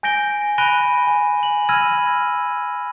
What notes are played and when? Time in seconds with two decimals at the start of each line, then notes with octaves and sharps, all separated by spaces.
0.03 G#5 G6 A#6 D7 G7
0.58 B5 F#6 A#6 D7 D#7 G7
1.07 G#5
1.43 F#7
1.69 B5 E6 F6 G#6 A#6 D#7